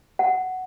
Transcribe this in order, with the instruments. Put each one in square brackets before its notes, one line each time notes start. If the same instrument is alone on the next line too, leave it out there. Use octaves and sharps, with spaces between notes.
[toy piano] F#5